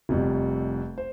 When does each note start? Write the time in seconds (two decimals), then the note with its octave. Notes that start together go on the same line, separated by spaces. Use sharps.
0.09 F1 F2 C3 G3
0.98 C5